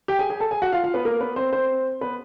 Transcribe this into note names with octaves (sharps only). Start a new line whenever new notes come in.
G4 G5
G#4 G#5
G#4 G#5
A4 A5
G#4 G#5
F#4 F#5
F4 F5
F4 F5
B3 B4
A#3 A#4
B3 B4
C4 C5
C4 C5
B3 B4